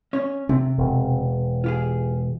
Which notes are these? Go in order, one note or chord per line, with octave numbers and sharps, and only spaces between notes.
C#4 C#5
C3 C4
E1
F4 G4 G#4